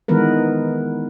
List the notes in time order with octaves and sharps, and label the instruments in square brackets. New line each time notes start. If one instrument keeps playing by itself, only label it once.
[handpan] D#3 E3 G#3 B3 A#4 B4